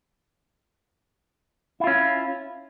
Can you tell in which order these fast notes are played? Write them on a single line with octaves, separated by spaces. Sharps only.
E4 F4 C#4